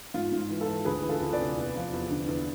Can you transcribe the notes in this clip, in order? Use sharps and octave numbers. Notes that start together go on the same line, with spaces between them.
G#2 F4
G#2 F4
E3
F4 A4
E3
D2 G#4 B4
E3
F4 A4
D2
B4 D5
C3
E2
F3
E2
D3
E2